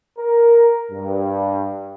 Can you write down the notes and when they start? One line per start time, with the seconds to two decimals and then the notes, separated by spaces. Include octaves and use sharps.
0.18 A#4
0.91 G2